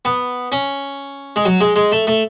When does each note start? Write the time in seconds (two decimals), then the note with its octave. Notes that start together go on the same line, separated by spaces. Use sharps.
0.05 B3
0.52 C#4
1.36 G#3
1.45 F#3
1.61 G#3
1.76 G#3
1.92 A3
2.07 A3